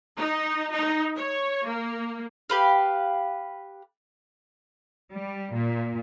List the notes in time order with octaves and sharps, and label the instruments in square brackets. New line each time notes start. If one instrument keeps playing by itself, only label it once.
[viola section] D#4
D#4
C#5
A#3
[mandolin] G4 B4 F5
[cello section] G3
A#2